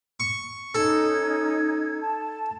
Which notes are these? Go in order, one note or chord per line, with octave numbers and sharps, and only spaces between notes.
C#6
C#4 D#4 A4 G#6
A5